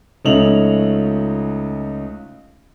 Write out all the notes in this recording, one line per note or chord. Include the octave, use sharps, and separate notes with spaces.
C#2 A3 C#4 D#4 F7 F#7